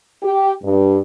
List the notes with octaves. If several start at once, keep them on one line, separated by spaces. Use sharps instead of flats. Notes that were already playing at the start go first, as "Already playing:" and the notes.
G4
G2